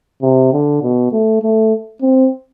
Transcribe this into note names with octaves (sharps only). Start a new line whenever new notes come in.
C3
D3
B2
A3
A3
C4